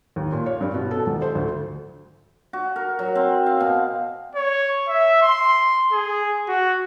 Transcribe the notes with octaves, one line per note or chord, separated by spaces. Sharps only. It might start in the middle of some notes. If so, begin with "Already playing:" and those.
D#2
A#2
C#5
G2
B2
A4
D#1
C5
D2
F#4
A#4
F#3
C4
F5
B2
C#5
E5
C6
G#4
F#4